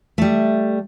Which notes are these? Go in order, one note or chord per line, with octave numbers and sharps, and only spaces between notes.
G3 A3